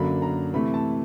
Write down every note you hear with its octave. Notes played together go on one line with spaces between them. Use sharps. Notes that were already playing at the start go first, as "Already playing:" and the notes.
Already playing: F#2 D3 F#3 A#3 B5
A#5
C3 E3 A3 B5
A5